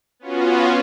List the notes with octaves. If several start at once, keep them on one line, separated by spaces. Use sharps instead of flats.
B3 C#4 F4 F#4